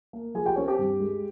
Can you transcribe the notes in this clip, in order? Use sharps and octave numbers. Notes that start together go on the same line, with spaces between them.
A#3
F3 G#4 G#5
G4 G5
C4 C#4 C#5
G4
G2
G#3